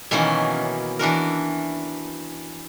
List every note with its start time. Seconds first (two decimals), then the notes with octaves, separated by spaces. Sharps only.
0.11 B2 D#3 E3 F#3 A#3 C#4
0.99 E3 D4 F#4 A#4